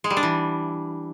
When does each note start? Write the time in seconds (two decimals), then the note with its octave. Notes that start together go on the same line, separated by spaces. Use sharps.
0.04 G#3
0.10 G3
0.17 D4
0.23 E3